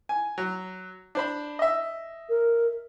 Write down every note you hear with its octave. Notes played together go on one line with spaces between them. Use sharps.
G#5
F#3
D4 C5 B5
D#5 E5
A#4